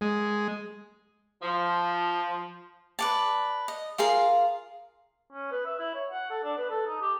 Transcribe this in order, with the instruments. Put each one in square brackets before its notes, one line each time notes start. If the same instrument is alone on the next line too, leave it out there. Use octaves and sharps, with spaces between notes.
[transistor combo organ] G#3
[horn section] F3
[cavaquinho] B4 D5 A5
D#5
F4 G#4 A#4 F5
[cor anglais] C#4
B4
E5
E4
C#5
F#5
A4
D4
B4
A4
D#4
G4